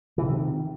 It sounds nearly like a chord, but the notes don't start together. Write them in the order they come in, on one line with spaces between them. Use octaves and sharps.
E3 C3 D#3